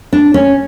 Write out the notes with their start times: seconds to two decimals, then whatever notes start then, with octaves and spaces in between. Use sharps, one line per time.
0.13 D4
0.34 C#4